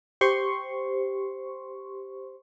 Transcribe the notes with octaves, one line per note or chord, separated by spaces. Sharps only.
G4 C5 C6 C#6